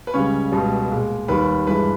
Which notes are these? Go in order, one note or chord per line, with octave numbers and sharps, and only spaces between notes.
B4
C#2 C#3 G3 C#4 C#5
C#2 B2 G3
A#2 G#3
D#2 D#3 G3 B4 B5
G2 E3 G#3 B4 B5